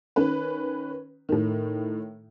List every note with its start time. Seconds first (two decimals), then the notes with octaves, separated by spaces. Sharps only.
0.16 D#3 C#4 B4
1.29 A2 D#3